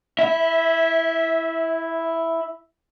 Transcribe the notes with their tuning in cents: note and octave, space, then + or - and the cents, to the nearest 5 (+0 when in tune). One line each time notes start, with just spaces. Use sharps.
E4 +0 E5 -20